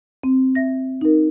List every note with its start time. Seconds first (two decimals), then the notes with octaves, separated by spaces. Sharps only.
0.23 C4
0.55 E5 A#6
1.01 D#4 A#4